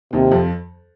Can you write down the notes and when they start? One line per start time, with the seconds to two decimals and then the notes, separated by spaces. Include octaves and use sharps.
0.13 D#2 C3 D#3
0.31 F2 F3